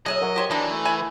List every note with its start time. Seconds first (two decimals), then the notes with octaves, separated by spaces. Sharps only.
0.06 F#3 G#3 G#4 C#5 D#5 E5
0.21 F#3 A#4 F#5
0.36 G4 C5 C#5
0.51 B2 D#3 E3 D4
0.70 A3
0.85 E4 G#5 B5